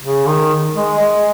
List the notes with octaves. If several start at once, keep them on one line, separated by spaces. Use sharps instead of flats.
C#3
D#3
G#3
G#3